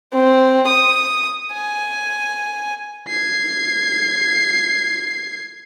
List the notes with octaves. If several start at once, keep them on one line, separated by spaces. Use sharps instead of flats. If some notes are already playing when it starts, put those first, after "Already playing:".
C4
D#6
G#5
G#6 C7